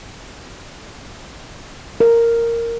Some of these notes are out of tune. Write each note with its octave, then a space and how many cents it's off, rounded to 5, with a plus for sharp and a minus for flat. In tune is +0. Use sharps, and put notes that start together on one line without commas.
A#4 -10